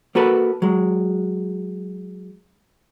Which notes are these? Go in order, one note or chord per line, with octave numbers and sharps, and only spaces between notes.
A#3 F#4 A4 B4
F#3 G#3